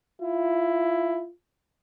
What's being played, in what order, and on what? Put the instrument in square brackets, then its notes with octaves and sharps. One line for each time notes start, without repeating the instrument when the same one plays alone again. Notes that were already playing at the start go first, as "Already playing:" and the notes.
[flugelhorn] E4 [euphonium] F4